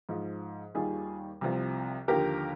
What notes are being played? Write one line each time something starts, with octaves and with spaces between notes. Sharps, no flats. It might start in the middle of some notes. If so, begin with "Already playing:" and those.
G#2 F3
D#2 D#3 G3 F4 G#4
C2 C3 F3
D#2 D3 F3 G4 A#4